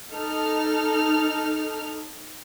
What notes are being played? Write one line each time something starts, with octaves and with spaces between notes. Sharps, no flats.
D#4 A4 F6